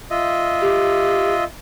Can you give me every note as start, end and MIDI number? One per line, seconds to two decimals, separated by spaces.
0.11 1.44 65
0.11 1.44 75
0.11 1.44 76
0.61 1.33 67